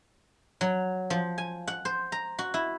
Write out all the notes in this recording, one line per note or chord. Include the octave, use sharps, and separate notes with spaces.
F#3
F3
G#5
F#5
C5
A#5
F#4
E4